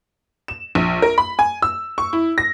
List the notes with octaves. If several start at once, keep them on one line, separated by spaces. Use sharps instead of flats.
E7
A#1
A#4
B5
G#5
E6
C#6
E4
A#6